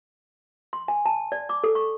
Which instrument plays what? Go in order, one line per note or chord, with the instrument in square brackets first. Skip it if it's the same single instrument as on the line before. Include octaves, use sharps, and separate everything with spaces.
[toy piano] C6
G#5
A5
D5
D6
A4
C#6